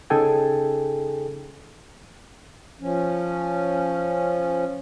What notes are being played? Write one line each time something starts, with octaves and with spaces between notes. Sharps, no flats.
C#3 D#4 G#4 A4 G5 G#5
F3 C#4